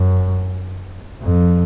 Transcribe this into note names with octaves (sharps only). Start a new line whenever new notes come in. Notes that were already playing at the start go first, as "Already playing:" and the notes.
Already playing: F#2
F2